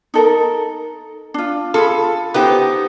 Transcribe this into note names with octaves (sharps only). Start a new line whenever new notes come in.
D#4 A4 A#4
D4 F4
F4 G#4 A4 B5
B3 D#4 G4 B4 C5